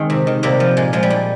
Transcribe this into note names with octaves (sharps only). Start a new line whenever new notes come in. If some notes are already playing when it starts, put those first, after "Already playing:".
Already playing: D#3 G#3 C4
C3
D#3
C3 G3 A#3
F3
A#2 G#3
F3 G#3
G3
A#2